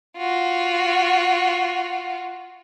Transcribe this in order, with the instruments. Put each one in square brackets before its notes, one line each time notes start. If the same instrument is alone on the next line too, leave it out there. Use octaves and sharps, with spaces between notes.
[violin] F4 F#4